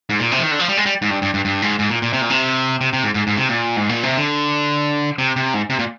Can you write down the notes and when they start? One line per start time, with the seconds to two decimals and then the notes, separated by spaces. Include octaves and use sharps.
0.10 G#2
0.20 A#2
0.31 C3
0.39 F3
0.43 D#3
0.51 D3
0.59 F3
0.68 G3
0.77 G#3
0.86 G3
1.02 G#2
1.10 G2
1.22 G2
1.34 G2
1.45 G2
1.62 G#2
1.79 G#2
1.90 A#2
2.02 A#2
2.13 C3
2.21 A#2
2.30 C3
2.81 C3
2.93 C3
3.04 G#2
3.14 G#2
3.27 G#2
3.37 C3
3.49 A#2
3.76 G#2
3.89 A#2
4.03 C3
4.17 D3
5.18 C3
5.36 C3
5.54 G#2
5.70 C3
5.79 A#2